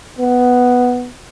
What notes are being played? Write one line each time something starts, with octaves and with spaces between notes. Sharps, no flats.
B3